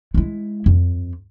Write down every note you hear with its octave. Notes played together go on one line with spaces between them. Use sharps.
G#3 E4
F2